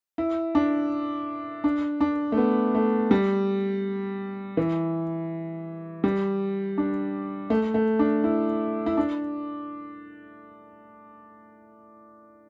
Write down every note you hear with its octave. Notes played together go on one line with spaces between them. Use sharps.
E4
D4
D4
D4
A3
B3
A3
G3
E3
G3
D4
A3
A3
D4
E4
E4
D4